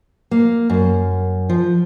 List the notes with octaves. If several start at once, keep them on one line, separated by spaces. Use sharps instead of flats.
A#3
F#2
F3